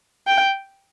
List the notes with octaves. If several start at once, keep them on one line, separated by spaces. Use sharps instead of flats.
G5